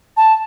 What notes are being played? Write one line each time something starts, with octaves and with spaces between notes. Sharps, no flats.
A5